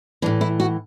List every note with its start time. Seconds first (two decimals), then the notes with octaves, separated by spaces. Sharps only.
0.22 E3 D4
0.26 A2
0.41 E4
0.60 F#4